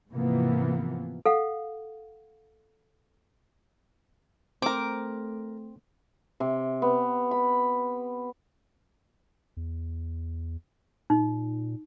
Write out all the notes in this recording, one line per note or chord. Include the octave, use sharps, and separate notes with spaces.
G#2 C3 E3 F3 A#3 B3
A4 F5 F#5
A3 C4 A#4 C5 D6
C3
B3
B5
E2
A#2 D#4